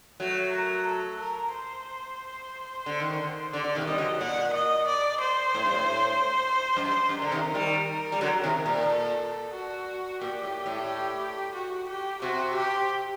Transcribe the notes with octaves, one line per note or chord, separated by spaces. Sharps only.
F#3 A3
A#4
A4
A#4
C5
D3
D#3
D3
D3 D5
D3
C3 D#3
G3 D#5
D3 F#3
A#2 F#5
D#5
D5
C5
A2
G2
A2
F#2
G2 C5
F#2
D3 A#4
C3 D#3
D#3 G3
G3
D3 F#3
C3 D#3
A#2
A4
F#4
A#2 G4
A2
A2
G4
F#4
G4
C3 F#4
G4